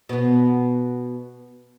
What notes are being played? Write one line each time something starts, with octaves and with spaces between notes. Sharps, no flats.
B2 B3